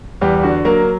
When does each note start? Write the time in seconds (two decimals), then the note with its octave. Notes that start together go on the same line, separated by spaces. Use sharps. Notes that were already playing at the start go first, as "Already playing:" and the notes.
0.21 E2 G3 G4
0.43 D3 F#4
0.65 F#3 A#3 A#4